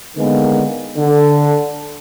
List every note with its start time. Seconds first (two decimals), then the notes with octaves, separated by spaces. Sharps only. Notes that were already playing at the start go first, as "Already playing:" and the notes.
0.17 D3 D#3 G#3 A#3 B3
0.97 D3